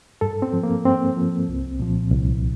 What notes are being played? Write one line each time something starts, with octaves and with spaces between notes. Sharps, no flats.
G2 A4
C4
F3
A#3
G2 C4
F3
C2
A#2 F3
C2